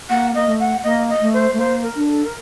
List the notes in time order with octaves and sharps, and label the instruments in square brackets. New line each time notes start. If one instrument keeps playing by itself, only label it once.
[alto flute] A#3 [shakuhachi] F#5
[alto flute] A#3 [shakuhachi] D#5
[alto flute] A3
[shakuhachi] F#5
[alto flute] A#3 [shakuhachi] D#5
[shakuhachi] D#5
[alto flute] A3
[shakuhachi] C5
[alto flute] A3
[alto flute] A#3 [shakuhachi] C5
[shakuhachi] A#4
[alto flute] D4
[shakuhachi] A4
A#4